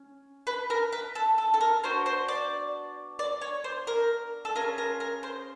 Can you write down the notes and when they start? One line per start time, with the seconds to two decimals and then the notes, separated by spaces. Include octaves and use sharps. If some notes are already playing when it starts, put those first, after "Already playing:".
Already playing: C#4
0.47 B4
0.70 A#4
0.93 B4
1.15 A4
1.38 A4
1.54 A4
1.61 A#4
1.83 B3 D4 F#4 C5
2.06 C5
2.28 D5
3.19 D5
3.41 C#5
3.64 C5
3.87 A#4
4.45 A4
4.55 C#4 F4 G#4 A#4
4.78 A#4
5.00 A#4
5.23 C5